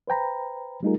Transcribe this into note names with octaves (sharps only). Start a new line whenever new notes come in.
B4 C5 G5 A#5 B5
G3 A3 D#4 F4 G#4 A#4